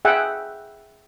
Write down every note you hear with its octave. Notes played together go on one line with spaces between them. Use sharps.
G#4 E5 F#5 G5